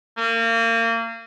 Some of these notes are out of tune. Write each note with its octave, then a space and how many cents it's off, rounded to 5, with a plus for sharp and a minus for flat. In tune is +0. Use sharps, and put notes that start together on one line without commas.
A#3 -30